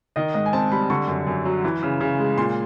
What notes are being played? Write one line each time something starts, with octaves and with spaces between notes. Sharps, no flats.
D#3 D#5
G#2 D#5
G#5
C4 A5
G3 B5
D3 C#6
F#2
F#2
F#3
E3
C#3
C#3
G#3
A#2 C6